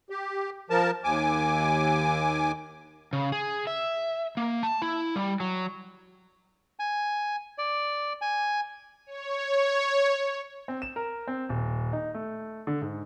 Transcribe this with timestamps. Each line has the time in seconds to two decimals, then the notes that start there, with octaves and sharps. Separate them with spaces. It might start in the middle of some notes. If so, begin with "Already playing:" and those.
0.10 G4
0.70 F3 A#4 A5
1.04 D#2 G#5 D6
3.13 C#3
3.32 G#4
3.67 E5
4.37 A#3
4.63 A5
4.82 E4
5.16 G3
5.40 F#3
6.79 G#5
7.58 D5
8.22 G#5
9.06 C#5
10.68 C4
10.82 E7
10.96 A#4
11.28 C4
11.49 D#1
11.93 D#4
12.14 A3
12.67 D3
12.82 G#2